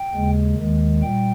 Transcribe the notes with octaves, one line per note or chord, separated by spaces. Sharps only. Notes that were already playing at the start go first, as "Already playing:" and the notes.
Already playing: G5
D#2 C#3 G#3
D#2 D#3 G#3
A#2 G3 G5